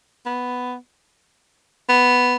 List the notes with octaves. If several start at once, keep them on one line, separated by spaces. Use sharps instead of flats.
B3
B3